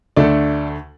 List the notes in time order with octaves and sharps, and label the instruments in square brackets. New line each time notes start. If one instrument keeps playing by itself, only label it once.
[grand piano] D2 D3 A3 A4 D5